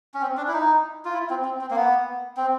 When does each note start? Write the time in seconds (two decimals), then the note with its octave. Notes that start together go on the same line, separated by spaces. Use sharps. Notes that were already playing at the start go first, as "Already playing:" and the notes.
0.14 C#4
0.22 C4
0.37 D4
0.48 E4
0.53 D#4
1.05 F4
1.14 E4
1.30 C4
1.45 C4
1.61 C4
1.71 A#3
1.76 B3
2.37 C4